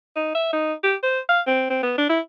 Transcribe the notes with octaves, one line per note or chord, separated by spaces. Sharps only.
D#4
E5
D#4
G4
C5
F5
C4
C4
B3
D4
E4